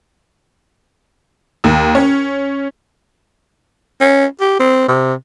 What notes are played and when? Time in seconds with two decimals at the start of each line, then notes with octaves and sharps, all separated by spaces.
1.64 D#2
1.95 C#4
4.01 C#4
4.40 G4
4.59 C4
4.88 C3